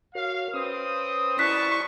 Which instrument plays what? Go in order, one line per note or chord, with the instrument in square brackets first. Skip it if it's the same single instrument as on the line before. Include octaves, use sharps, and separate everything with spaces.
[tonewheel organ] F#4 A#4 C#5 [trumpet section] F5
[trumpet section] C4 D#6 [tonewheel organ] C#4 B4 C5
[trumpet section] G3 A5 [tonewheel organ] E4 D5 B5 [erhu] C#6 [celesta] F#6 B6